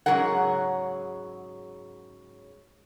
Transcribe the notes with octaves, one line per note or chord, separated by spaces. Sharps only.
G#2 C#3 F#3 G#4 A#4 F#5